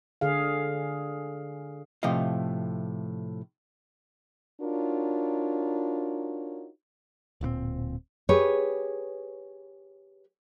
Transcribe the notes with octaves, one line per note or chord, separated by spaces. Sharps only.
D3 G#4 F5
A2 C3 F3 A3 D#5 F5
D4 D#4 F4 F#4 A#4 C#5
D1 A#2 B3 C4
G4 G#4 B4 C#5